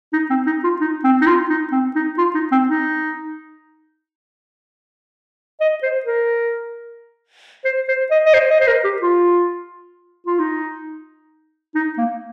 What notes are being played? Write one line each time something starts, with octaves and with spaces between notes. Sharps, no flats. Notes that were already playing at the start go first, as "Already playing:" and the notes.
D#4
C4
D#4
F4
D#4
C4
D#4
F4
D#4
C4
D#4
F4
D#4
C4
D#4
D#5
C5
A#4
C5
C5
D#5
D#5
C5
D#5
C5
A#4
G4
F4
F4
D#4
D#4
A#3